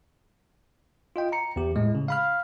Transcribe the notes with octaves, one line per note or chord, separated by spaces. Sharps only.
F4 D#5 G5
A#5 C#7
E2 G4
A2 G#3
C#3
F5 B5 F6